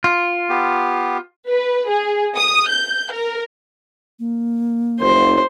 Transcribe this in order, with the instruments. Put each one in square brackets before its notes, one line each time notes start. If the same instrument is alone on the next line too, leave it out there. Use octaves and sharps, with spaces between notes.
[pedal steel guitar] F4
[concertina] B3 G4
[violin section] B4
G#4
D#6
G6
A#4
[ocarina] A#3
[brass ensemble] F#1 [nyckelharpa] C5